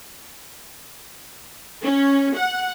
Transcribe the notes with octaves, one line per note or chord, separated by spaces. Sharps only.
C#4
F#5